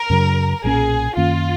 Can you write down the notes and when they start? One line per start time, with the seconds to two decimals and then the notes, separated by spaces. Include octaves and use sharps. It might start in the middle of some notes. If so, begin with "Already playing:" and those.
Already playing: A#4
0.10 F#2 C#3 F#3
0.64 B1 A#2 F#3 C#4 G#4
1.17 F#2 D#3 A#3 C#4 F4